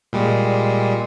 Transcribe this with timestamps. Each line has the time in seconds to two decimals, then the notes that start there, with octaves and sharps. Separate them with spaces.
0.13 A#2 G3 G#3